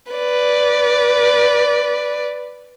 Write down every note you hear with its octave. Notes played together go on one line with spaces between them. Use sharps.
B4 D5